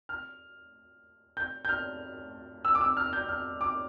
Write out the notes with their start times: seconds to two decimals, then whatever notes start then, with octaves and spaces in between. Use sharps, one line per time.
0.09 F6
1.37 G6
1.65 G6
1.69 F6
2.65 E6
2.75 D6
2.81 E6
2.97 F6
3.13 G6
3.29 F6
3.61 D6